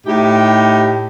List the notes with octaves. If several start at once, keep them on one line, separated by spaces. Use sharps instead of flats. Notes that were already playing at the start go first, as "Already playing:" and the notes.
A2 D#4 G4